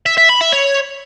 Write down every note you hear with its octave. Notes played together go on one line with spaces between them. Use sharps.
E5
E5
B5
E5
C#5